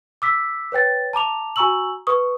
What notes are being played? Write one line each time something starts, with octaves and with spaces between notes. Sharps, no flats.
D6 E6 B6
B4 C#5 G5 A6
A5 A#5 D6 F7
F#4 G#5 A#5 C#6 E6 F#7
B4 C#6 D#6